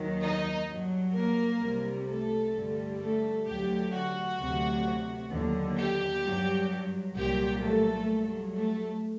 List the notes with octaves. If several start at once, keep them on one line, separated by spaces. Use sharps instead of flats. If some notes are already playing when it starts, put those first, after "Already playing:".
Already playing: D#2 D#3 F#3
D#4 D#5
G2 F#3
A#3 A#4
C2 C3 G3
A3 A4
G2 D3 G3
A3 A4
D2 D3 F#3 G4
F#4
D2 C3 F#3
D#2 D3 F#3
G4
G2 F#3
C2 A#2 F#3 G4
A3 A4
G2 F#3
A3 A4